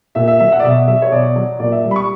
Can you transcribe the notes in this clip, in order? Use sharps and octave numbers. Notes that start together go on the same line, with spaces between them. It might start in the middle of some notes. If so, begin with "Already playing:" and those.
A#2 E5
E5
F#3 E5
F#5
D5
B2 E5
F#3 E5
C#5
B2 D5
F#3
A#2 D5
E5
G3
B5
C#6